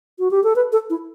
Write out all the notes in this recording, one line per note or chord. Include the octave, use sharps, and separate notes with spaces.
F#4
G4
A4
B4
A4
E4